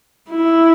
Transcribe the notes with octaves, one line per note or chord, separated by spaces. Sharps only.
E4